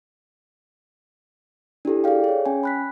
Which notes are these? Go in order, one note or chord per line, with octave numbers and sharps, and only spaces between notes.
D4 E4 G4 A4
G#4 A4 D5 F5 G5
G#4 C#5
C#4 G5 G#5
B5 F#6 B6